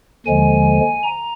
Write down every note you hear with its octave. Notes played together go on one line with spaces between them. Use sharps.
D#2 D3 F3 G#3 G#5
A#5